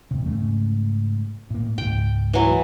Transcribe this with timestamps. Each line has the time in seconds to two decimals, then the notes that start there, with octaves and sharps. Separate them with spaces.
0.11 E2 C3
0.26 G#2 C#3 A3
1.50 A2 A#3
1.78 C#2 G#2 G5
2.33 E3 F#3